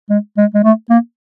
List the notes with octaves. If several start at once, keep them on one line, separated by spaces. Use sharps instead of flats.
G#3
G#3
G#3
A3
A#3